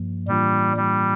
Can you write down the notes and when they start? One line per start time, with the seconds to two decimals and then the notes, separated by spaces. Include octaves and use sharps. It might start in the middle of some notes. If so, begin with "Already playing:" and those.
Already playing: G2 F3 A#3
0.27 A2 E3 G3 A#3 D4 F4
0.77 G3